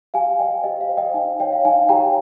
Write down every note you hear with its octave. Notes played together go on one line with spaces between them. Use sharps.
G4 F5 G#5
C5 D#5 G5
G4 D#5
F5
C5
D#5 G5
D#4 F5 G#5
G4 C#5 D#5 G5
F5
D#4 F5 G#5
G4 C#5 G5 A#5